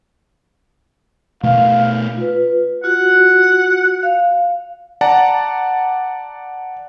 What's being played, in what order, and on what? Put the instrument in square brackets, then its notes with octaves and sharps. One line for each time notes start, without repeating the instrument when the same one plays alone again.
[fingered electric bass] B2 A3 [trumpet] F5
[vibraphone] F4 B4
[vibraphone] F4 F#4 [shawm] F#5
[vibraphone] F5
[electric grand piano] D5 F#5 A5 A#5